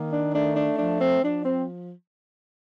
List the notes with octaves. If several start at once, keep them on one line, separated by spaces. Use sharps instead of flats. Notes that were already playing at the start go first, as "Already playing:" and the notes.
Already playing: D#3 A#3
D4
A3 D4
D4
F3 D4
C4
F3 D4
C4